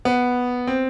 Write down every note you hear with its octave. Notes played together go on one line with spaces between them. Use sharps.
B3
C4